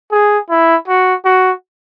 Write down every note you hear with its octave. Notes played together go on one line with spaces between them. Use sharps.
G#4
E4
F#4
F#4